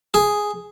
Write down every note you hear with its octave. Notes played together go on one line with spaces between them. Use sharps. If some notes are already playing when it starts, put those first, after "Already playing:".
G#4